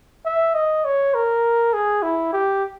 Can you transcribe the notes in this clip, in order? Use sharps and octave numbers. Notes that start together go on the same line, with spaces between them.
E5
D#5
C#5
A#4
G#4
E4
G4